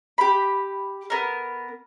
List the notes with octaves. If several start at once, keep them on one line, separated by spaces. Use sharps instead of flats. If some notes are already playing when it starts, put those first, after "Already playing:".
G4 B5
B3 A#4